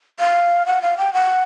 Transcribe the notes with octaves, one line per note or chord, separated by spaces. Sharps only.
F5
F#5
F5
G5
F#5